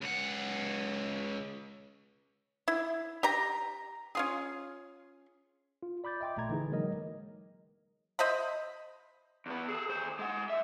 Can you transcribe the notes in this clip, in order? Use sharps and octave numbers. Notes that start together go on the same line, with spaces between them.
C#2 F#5
E4
G4 A#5
C#4 F4 G#4
F4
D5 B5 D6 G6 A6
D#5 E5 G5 C6 D6
A1 A#2 A3 A#5 G#6
D3 E3 D#4 G#4
F#3 G#3 A#3 A#4 D#5
C5 D#5 E5 B5
E2 B3
G#4 A4
D#2 C5
G#3 F#5
F#2 E5